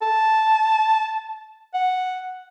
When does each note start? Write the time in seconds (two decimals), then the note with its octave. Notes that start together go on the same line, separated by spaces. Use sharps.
0.02 A5
1.74 F#5